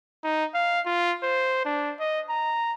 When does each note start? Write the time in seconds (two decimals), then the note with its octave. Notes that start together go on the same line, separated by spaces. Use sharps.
0.24 D#4
0.54 F5
0.86 F4
1.23 C5
1.65 D4
1.99 D#5
2.29 A#5